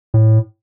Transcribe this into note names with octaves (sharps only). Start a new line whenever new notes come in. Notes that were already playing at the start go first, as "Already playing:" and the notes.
A2